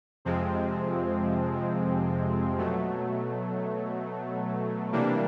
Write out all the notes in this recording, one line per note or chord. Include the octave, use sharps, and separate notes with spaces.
F2 C3 F3 G#3 C4
B2 F#3 A3
C3 E3 G3 A#3 D4